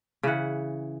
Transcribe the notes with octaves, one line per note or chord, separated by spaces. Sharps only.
C#3 E3 F#5